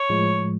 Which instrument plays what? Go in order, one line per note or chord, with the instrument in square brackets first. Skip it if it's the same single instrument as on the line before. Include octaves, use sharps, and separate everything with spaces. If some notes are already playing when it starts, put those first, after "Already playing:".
Already playing: [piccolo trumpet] C#5
[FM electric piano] A2 F3 G#3